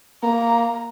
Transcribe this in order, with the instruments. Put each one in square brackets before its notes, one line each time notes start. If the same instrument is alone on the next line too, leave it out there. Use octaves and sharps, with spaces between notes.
[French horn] A#3 [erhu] A#5